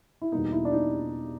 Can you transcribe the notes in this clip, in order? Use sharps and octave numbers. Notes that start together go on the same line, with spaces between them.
E4
E2 B2 G3 A#3 D#4
E4
D4
D#4